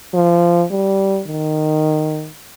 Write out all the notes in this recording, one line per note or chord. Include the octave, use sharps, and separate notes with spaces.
F3
G3
D#3